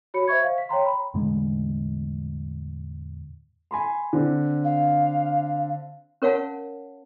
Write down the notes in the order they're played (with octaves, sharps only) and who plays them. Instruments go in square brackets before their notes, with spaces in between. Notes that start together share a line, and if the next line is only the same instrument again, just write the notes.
[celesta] F#4 C#5 B5 C#7
C5 D#5 E5 C#6 G#6
F5
B6
C#5 G5 A#5 C6
B5
[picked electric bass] E2 A2 D3 G#3
[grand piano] G#5 B5 C6
D3 C4
[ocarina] F5
[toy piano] C#4 A#4 C#5 F5 F#5 A5